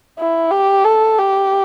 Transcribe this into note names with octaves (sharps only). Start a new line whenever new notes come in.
E4
G4
A4
G4